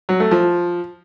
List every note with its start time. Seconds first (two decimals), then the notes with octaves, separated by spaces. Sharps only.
0.09 F#3
0.20 A3
0.31 F3